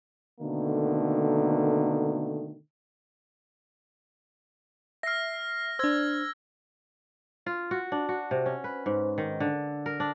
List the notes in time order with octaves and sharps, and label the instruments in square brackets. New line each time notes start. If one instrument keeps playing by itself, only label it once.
[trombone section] B2 D3 D#3 A3 A#3
[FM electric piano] E5 C7 [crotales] F6 A#6
[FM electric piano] D4 C5 [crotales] E6 G#6
[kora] F4
F#4
D4
F#4
C3
C#4
B4
G#2
D#3
D3
A#4
D4